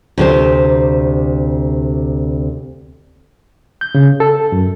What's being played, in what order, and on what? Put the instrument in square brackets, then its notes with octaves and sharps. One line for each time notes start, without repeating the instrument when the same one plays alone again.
[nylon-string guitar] D2 C3 C5
[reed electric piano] G6
C#3
A4
F#2